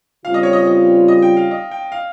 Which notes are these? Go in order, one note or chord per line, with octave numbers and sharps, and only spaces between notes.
C#3 G3 C4 F4 F5
D#5
C#5
D#5
D#5
D#5
G5
F5
D#5
G5
F5